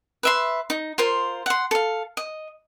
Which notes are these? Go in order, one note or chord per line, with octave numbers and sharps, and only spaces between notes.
B4 E5 C6
D#4
F4 A#4 C5
F#5 C6
A4 F5
D#5